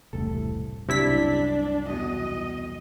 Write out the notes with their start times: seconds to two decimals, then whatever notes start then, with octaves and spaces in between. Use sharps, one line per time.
0.13 E1 C2 A2 A4
0.89 C2 F#2 C3 D4 E4 B6
1.90 E2 B2 F#3 D#5